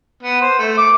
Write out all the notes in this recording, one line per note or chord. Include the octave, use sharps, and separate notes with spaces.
B3
C5
A3
D6